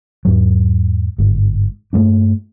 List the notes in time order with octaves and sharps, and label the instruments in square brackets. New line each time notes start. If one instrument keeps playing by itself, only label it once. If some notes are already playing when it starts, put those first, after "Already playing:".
[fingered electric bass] E2 G#2 F#3
G1 G#2
G2 A3 A#3 D4